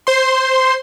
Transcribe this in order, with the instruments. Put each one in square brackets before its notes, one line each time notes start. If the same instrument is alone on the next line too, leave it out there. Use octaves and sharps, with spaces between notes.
[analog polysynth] C5 C6